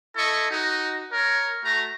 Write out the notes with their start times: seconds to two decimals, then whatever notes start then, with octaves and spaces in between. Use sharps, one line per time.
0.16 E4 A4 D#5 C#6
0.50 D#4 F#4
1.13 A#4 C#5
1.65 A3 F#4 A#5